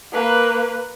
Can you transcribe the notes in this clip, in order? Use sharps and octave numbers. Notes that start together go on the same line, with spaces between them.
A#3 B4